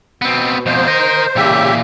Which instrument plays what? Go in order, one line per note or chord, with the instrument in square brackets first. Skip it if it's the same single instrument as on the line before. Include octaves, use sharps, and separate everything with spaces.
[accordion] B2 [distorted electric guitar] B3 C4
[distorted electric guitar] F2 B2 [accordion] C5
[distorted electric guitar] A#4 D#5
[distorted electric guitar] A#2 E3 [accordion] C#3 G4 E5